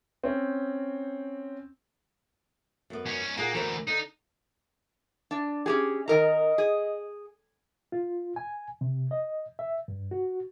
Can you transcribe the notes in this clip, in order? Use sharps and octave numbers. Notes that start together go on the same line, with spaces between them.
C4 C#4
F#2 B3
G#2 C#4
A#2 A#3 G#4 F#5
D2 E3 F#4 A#4 C5
D3 D#4
D4
C#4 G4 G#4
D#3 A#4 D#5 A#5
G#4
F4
G#5
C3
D#5
E5
G2
F#4